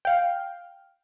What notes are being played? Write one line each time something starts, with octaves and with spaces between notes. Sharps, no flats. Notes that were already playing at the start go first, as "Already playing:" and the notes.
F5 G5